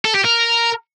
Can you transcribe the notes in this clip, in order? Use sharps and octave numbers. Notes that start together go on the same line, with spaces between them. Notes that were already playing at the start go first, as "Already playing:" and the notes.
A4
G4
A#4